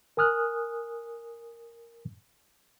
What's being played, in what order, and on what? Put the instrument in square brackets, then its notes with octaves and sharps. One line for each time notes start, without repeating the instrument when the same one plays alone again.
[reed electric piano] A#4 G#5 D#6 F6 F#6